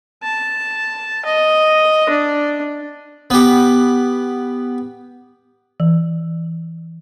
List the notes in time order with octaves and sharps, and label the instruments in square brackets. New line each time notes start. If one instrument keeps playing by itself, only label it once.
[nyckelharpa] A5
D#5
D4
[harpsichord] B3 G4
[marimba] E3